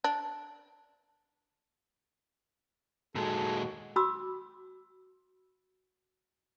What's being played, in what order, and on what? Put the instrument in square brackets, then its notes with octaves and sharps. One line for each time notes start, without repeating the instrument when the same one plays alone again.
[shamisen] D4
[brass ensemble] D#2 D#4 F#4 [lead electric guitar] A#2 G#3 [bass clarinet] A4
[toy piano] F#4 B5 D6 E6